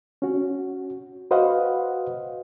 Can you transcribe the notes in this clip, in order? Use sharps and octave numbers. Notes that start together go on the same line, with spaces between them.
C#4 F#4
F#4 B4 C5 D#5 F5 F#5